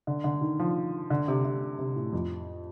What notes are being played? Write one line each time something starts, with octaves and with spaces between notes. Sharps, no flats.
D3
D3
D#3
F3
D3
C3
C3
C3
A2
F2